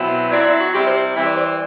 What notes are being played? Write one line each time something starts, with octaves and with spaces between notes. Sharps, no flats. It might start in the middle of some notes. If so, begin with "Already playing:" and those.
Already playing: B2 F#3 C4 E4
F#3 C4 E4 D5
E4
F#4
C3 G3 C4 E4 G4
C5
E3 G3 C4 E5
D5
C5
D5